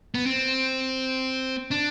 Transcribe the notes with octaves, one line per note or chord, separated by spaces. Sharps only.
B3
C4
D4